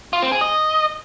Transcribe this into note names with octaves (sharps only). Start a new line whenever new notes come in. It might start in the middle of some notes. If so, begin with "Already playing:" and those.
F4
C4
G#4
D#5